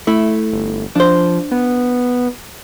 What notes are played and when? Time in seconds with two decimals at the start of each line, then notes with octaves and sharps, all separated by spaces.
0.07 A3 E4
0.52 G1
0.95 F3 D4 C5
1.51 B3